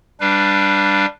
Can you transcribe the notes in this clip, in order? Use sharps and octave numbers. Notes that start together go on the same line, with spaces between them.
G3 D4 B4 F5